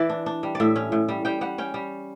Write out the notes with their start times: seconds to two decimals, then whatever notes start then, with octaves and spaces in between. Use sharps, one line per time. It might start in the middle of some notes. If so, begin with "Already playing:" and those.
Already playing: E3 D5 E5
0.10 D4
0.26 D4
0.43 G3
0.55 D5
0.60 A2 E5
0.76 C#4
0.92 A2
1.08 G3
1.25 G3 G5
1.41 G3 F#5
1.58 C#4 G5
1.74 G3